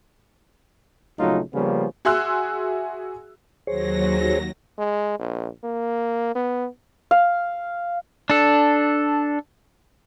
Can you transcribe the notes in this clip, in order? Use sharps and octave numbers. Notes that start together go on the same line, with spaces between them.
A#1 C#3 F#3 A3 D#4 F4
C#3 F3 G3 A#3 B3 C#4
F#4 G#4 E5 C6 E6 F#6
D#2 F#3 G#4 C5 C#5 A#6
G#3
A#1
A#3
B3
F5
D4 A4